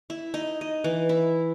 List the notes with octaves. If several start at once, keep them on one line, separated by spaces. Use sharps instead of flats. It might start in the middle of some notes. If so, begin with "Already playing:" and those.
E4
D#4
D#5
E3
E4